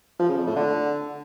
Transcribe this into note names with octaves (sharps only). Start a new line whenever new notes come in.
F3
C#3
F2
A2
D3